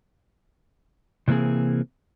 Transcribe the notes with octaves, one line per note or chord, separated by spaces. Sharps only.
C3 E3 A#3 C4 G#4